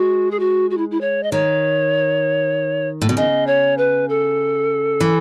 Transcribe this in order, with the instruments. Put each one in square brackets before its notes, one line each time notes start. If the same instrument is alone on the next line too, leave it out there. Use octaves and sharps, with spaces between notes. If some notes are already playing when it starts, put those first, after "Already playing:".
Already playing: [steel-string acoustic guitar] G#3 [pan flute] F#4
[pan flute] G#4
F#4
F#4
E4
E4
C#5
D#5
[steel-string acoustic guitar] D#3 [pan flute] C#5
[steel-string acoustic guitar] A2
B2
[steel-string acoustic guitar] C#3 [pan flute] D#5
[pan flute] C#5
B4
A4
[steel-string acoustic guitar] E3